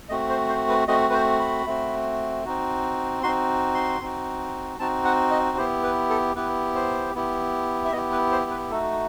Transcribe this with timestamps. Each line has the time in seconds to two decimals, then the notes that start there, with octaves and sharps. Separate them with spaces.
0.09 A3 C4 F#4 D#5
0.30 C5
0.49 C5
0.69 B4
0.88 A3 C4 F#4 D#5
1.09 B4
1.14 C5
1.40 B5
1.66 A3 C4 F#4
2.45 C4 D#4 F#4
3.23 C4 D#4 F#4 C6
3.75 C6
4.01 C4 D#4 F#4
4.79 C4 D#4 F#4 A5
5.05 F#5
5.31 D#5
5.58 B3 E4 G4 C5
5.84 B4
6.10 A4
6.36 B3 E4 G4 B4
6.75 C5
7.15 B3 E4 G4
7.85 E5
7.92 B3 D#5
7.95 E4 G4
8.12 B4
8.32 C5
8.51 B4
8.70 A3 D#4 F#4 A4